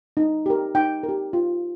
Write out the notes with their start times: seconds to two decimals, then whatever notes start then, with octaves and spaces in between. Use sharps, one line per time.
0.17 D#4
0.46 G4 A#4
0.75 D#4 G5
1.03 A#4
1.09 G4
1.33 F4